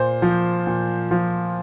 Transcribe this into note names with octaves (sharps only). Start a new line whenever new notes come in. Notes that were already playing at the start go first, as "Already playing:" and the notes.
Already playing: A#2 C5
F3
A#2
F3